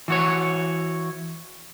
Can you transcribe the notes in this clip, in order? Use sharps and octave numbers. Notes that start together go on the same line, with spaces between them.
E3 F#4 C#5